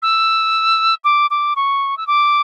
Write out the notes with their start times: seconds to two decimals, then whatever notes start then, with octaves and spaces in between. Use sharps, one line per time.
0.02 E6
1.04 D6
1.31 D6
1.56 C#6
1.97 E6
2.07 D6